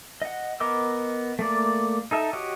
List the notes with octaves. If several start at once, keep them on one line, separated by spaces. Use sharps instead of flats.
D#5 F#5
B3 A#4 D#5 D6 E6
A3 A#3 D5
D#4 A4 E5
F#4 G4 C#5 D#5